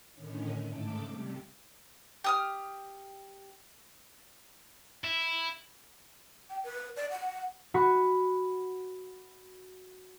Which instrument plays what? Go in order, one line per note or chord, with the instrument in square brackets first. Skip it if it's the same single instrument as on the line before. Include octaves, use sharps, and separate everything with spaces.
[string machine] A2 D3 D#3 C#4
G#2 C#3 A3 A4 D6
C3 G3
[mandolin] G4 D#6 F6
[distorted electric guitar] E4
[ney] G5
B4
D5
F#5
[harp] F#4 B5 C#6